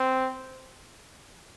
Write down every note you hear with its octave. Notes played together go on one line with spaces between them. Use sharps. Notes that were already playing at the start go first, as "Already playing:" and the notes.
Already playing: C4